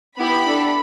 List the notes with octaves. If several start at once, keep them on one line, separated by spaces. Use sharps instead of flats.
B3 E4 G4 B5
D4 A4